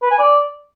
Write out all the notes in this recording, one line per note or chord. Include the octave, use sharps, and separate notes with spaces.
B4
G#5
D5